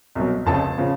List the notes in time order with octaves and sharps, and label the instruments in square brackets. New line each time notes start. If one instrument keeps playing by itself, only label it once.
[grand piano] C2 B2 F#3
F1 F2 C#3 F3 A5
C#3 F3